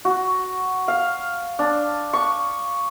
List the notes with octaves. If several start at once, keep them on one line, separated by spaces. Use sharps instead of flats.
F#4
F5
D4
C#6